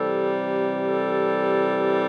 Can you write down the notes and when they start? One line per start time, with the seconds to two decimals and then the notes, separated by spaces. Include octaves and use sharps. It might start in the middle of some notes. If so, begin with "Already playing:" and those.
Already playing: C3 E3 G3 A4
0.88 A4